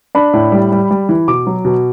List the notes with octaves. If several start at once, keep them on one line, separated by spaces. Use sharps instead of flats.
D4 B5
A2
G3
G3
G3
E3
B2 D6
F#3
B2